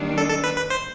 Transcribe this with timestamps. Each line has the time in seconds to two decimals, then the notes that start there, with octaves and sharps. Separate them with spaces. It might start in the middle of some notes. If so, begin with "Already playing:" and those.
Already playing: D#3 G3 A#3 D4
0.18 A4
0.30 A4
0.44 B4
0.56 B4
0.70 C5